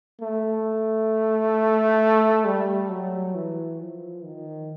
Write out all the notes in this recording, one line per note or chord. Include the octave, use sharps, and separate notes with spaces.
A3
G3
F#3
E3
F3
D#3